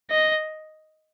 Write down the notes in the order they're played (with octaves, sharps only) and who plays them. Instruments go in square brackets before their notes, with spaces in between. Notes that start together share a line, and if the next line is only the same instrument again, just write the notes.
[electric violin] D#5